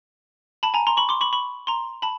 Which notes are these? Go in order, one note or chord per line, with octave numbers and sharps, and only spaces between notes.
A5 B5
G#5 A#5
A#5 C6
B5 C#6
C6 D6
B5 C#6
B5 C#6
A#5 C6
A5 B5